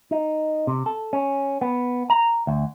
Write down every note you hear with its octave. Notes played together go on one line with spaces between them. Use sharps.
D#4
C3
A4
C#4
B3
A#5
D2